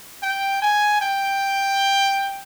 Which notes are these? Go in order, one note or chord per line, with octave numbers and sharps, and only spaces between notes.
G5
G#5
G5